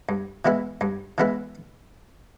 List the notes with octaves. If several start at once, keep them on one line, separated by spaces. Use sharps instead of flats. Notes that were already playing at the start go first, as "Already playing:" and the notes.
G2
E3 G#3 B3 E4
G2
E3 G#3 B3 E4